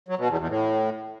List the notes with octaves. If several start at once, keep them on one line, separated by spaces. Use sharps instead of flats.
F#3
B2
E2
E2
A2